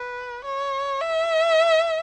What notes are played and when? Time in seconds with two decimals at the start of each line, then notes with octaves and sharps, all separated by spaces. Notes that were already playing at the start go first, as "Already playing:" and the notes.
Already playing: B4
0.45 C#5
1.01 E5